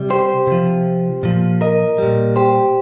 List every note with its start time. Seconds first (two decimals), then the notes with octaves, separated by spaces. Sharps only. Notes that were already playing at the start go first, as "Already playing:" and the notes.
Already playing: C3 G3
0.10 G4 C5
0.47 C3 F3
1.23 A#2 F3
1.61 A#4 D#5
1.98 A#2 G3
2.36 G4 C5